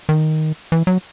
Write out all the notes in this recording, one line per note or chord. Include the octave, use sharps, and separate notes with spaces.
D#3
E3
F#3